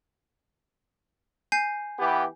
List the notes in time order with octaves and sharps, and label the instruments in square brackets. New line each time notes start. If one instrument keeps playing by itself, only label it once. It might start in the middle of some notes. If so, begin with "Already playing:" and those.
[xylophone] G#5 G6 C7
[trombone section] E3 B3 G4